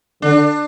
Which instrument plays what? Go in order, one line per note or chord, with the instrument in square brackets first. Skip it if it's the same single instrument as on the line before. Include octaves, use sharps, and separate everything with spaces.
[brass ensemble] D3 [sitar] D4